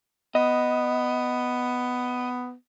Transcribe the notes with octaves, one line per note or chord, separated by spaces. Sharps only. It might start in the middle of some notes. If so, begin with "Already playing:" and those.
B3 D#5